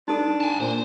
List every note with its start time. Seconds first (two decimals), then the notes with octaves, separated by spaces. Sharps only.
0.08 D4 D#4 A4
0.41 G#5 A5
0.61 A#2 C5